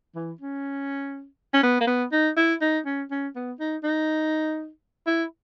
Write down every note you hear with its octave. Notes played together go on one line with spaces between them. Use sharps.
E3
C#4
C#4
B3
A#3
B3
D#4
E4
D#4
C#4
C#4
B3
D#4
D#4
E4